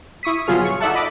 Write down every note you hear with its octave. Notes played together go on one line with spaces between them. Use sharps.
E4 C#6 D#6 B6
G1 B2 F#3 F4 G#4 F6
C#6
D#4 A4 D5 E5 F#5 A5
D#5 B5 D6